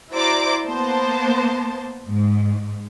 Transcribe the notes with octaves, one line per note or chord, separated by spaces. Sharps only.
E4 F#4 C5 D5 A#5 D6
A#3 B3 C5 A5
G#2